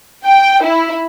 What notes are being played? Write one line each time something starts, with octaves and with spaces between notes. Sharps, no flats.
G5
E4